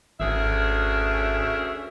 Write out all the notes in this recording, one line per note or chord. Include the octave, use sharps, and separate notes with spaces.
G#1 D2 C#4 G#4 A#4 E5